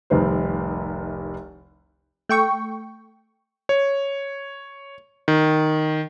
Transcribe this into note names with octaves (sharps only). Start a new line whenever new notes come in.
F1 C2 D#3 B4 C5
A3 G5 C#6
C#5
D#3